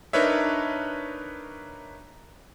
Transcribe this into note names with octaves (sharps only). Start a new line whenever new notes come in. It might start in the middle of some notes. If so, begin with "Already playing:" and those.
D4 D#4 A#4 B4 C#5 E5